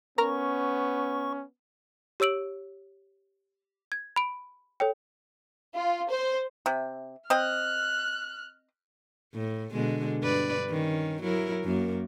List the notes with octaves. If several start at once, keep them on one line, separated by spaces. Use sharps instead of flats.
B3 C#4 A#4 A#5 C#6 F6
G4 C#5 E6 D7 F#7
G#6
B5 D7
A4 C#5 G5
F4
C5
C3
C4 D#5 F6 F#6
A2
B2 D3 G#3
G2 B4 D5
D#3 C#4
F#3 E4 A#4
F#2 A#3